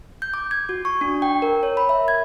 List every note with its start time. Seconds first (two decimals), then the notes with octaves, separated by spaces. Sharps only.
0.22 G6
0.34 D6
0.51 G#6
0.69 F#4
0.85 C#6
1.01 D4
1.22 G5
1.42 A#4
1.63 C#5
1.77 B5
1.89 E5
2.08 G#6